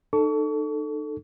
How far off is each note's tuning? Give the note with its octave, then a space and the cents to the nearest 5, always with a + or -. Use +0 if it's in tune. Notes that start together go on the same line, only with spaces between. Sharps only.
D#4 -35 A4 +0 C#6 +40